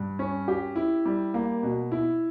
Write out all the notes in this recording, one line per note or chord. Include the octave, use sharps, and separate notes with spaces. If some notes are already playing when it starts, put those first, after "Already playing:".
Already playing: G2
C#4
G4
E4
G3
A#3
B2
E4